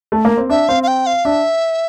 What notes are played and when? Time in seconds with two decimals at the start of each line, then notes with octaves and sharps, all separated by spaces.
0.12 A3
0.25 A#3
0.37 C4
0.49 D4 E5
0.69 C4 F5
0.83 F5
0.88 G5
1.06 F5
1.25 D4 E5